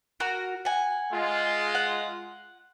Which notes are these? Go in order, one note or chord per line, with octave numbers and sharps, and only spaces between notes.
F#4 A#4
F#5 G#5
G#3 F4
F#5